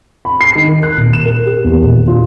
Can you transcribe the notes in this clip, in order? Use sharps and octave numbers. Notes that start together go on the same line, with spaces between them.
B5
C7
D#3
A#4
F#6
D#1
E7
A#4
G4
E2
D#1
F4